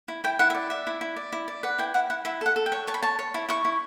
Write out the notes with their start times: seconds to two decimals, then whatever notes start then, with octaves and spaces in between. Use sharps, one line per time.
0.08 E4
0.24 E4 G5
0.39 E4 F#5
0.50 E5
0.55 D5
0.70 D5 E5
0.87 E4
1.01 E4
1.16 D5
1.32 E4
1.48 D5
1.63 B4 F#5
1.78 E4 G5
1.94 E4 F#5
2.10 E4 F#5
2.25 E4 E5
2.41 A4 F#5
2.56 A4
2.66 G5
2.72 C#5
2.87 C#5 A5
2.94 B5
3.03 C#5 A5
3.19 C#5
3.34 E4
3.49 E4 C#6
3.65 E4